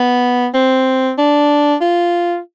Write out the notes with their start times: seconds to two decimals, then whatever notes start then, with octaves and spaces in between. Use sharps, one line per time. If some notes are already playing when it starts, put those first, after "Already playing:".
Already playing: B3
0.54 C4
1.18 D4
1.81 F4